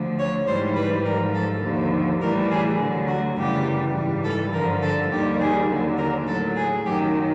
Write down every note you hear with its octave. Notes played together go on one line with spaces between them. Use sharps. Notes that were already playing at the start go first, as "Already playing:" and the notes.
Already playing: D2 D3 F3
C#5
G#2 E3 G3 C5
B4
G#2 F3 A#4
A4
D#2 D3 F3
A2 E3 G3 A#4
G#4
D2 D3 F#3
F#4
F#2 C#3 E3 G3 G4
G#2 E3 G3
A4
G2 D3 F3 A#4
A4
D#2 D#3 G3 G4
G#4
D#2 D3 F#3
A#4
A2 F#3 A4
G#4
F#2 D#3 F#3 G4